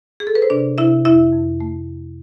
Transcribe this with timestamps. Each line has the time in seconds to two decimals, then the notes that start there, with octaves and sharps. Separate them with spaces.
0.20 G#4
0.27 A4
0.35 B4
0.42 C5
0.50 C3 D4 D5
0.78 C3 E4 E5
1.05 F2 E4 E5
1.32 F2
1.61 A3